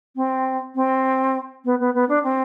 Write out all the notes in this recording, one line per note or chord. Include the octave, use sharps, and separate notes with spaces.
C4
C4
B3
B3
B3
D4
C4